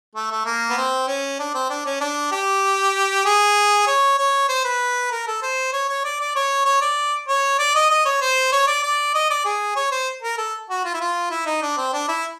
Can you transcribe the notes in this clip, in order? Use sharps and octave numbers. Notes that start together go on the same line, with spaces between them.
A3
A3
A#3
B3
C4
C#4
D4
C4
D4
C#4
D4
G4
G#4
C#5
C#5
C5
B4
A#4
A4
C5
C#5
C#5
D5
D5
C#5
C#5
D5
C#5
D5
D#5
D#5
C#5
C5
C#5
D5
D5
D#5
D5
G#4
C#5
C5
A#4
A4
F#4
F4
E4
F4
E4
D#4
D4
C4
D4
E4